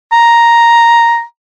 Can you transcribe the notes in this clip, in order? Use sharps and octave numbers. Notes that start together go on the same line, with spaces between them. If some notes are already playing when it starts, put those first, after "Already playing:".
A#5